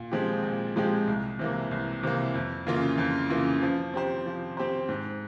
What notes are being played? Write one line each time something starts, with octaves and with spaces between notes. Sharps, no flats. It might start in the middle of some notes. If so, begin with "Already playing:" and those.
Already playing: A#2
F3 G#3 C4 G4
A#2
F3 G#3 C4 G4
C2
C3 E3 A#3
C2
C3 E3 A#3
F2
C#3 E3 A#3 F4
F2
C#3 E3 A#3 F4
F3
C4 G4 C5
F3
C4 G4 C5
G#2